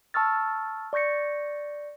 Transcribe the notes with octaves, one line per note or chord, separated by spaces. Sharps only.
A5 C#6 E6 F6 A6
D5 C#6 G6 A#6 C#7